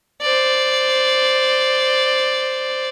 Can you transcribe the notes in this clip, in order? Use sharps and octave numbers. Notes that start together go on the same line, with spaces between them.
C5 D5